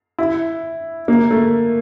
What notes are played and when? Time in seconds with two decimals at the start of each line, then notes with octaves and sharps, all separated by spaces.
0.18 E4
1.08 A#3
1.31 A3